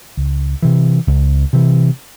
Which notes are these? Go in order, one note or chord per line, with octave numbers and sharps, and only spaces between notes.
C#2
C3 E3
C#2
C3 E3